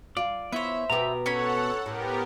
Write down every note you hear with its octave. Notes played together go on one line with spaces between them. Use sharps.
F4 D5
B3 E4 C5 C#5 E5
B2 B3 G4 A#5
C#4 A4 C#5 F#5 B5
A2 B3 G4 A#4